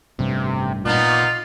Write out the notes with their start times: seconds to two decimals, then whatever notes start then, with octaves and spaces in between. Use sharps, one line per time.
0.19 A1 G2 C3
0.86 A#2 B3 D#4 F4